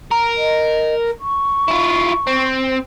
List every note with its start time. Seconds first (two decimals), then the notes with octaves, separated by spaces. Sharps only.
0.11 A#4
0.37 D#5
1.20 C#6
1.68 E4 F4
2.27 C4